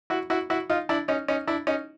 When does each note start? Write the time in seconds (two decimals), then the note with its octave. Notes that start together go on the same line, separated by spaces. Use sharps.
0.10 E4 F#4
0.30 E4 F#4
0.50 E4 F#4
0.69 D#4 F4
0.89 D4 E4
1.08 C#4 D#4
1.28 C#4 D#4
1.48 D4 E4
1.67 C#4 D#4